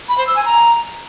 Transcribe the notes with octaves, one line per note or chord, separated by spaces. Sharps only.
B5
C5
E6
G#5
A#5